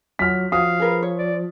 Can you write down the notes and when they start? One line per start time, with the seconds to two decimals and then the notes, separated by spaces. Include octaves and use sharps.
0.19 F#3 F4 F6 B6
0.52 F3 F#4 C#5 F5 D#6
0.80 G#4 A#4 B4
1.03 C#5
1.18 D5